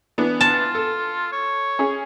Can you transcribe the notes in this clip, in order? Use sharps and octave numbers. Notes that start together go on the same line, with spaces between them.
E3 B3 D4
F4 A5
A4
C#5
C#4 G#4